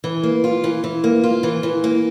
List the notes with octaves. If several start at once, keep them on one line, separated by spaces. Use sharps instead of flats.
E3
A#3
F4
E3
E3
A#3
F4
E3
E3
A#3